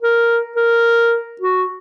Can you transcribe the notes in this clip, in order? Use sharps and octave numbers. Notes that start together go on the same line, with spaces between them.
A#4
A#4
F#4